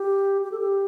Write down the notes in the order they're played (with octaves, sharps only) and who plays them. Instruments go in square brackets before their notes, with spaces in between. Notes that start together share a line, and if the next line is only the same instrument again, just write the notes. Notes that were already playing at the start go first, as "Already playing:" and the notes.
Already playing: [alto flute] G4
G4
A4
G4